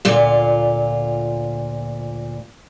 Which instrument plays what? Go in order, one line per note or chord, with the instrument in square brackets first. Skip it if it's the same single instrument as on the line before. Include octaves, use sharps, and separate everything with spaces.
[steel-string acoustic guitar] D2 A#2 F4